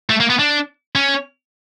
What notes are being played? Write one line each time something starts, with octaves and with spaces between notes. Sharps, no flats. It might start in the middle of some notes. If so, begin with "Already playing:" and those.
A3
A#3
B3
D4
C#4